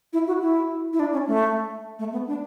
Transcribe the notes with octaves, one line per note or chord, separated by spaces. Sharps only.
E4
F#4
E4
E4
D4
C#4
A3
A3
B3
D4